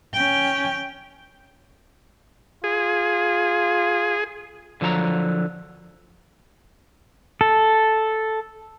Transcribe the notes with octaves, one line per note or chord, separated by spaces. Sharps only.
C#4 G5
F4 G#4
D3 F3 F#3 A5 A#5
A4